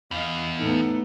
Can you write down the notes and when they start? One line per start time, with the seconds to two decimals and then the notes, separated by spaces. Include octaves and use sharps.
0.11 E2 D#5 F5
0.60 A2 B3 D#4 A4